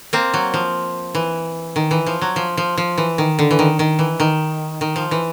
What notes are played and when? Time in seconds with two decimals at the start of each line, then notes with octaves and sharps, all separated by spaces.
0.13 A#3 C4
0.34 F#3
0.54 F3
1.15 E3
1.76 D#3
1.91 E3
2.06 F3
2.21 F#3
2.36 F3
2.57 F3
2.77 F3
2.98 E3
3.18 D#3
3.39 D3
3.51 E3
3.59 D#3
3.79 D#3
3.99 E3
4.20 D#3
4.81 D#3
4.96 F3
5.11 E3